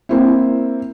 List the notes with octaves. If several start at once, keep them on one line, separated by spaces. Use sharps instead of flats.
A#3 C4 E4